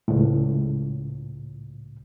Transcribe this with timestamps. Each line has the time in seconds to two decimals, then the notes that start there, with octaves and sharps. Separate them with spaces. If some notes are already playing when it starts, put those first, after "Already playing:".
0.08 C#2 A2